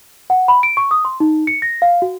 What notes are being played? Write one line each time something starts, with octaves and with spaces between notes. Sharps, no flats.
F#5
B5
D7
C#6
D#6
C6
D#4
C#7
A#6
F5
F#4